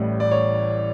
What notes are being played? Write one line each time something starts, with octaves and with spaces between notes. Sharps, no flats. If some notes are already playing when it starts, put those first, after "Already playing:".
Already playing: A1 A2 G3
D5
C#5